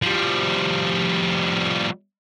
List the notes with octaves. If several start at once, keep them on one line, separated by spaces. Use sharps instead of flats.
F3 G3